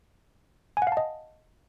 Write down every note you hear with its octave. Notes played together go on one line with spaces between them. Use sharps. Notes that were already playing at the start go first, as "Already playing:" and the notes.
G#5
F#5
F5
A5
D#5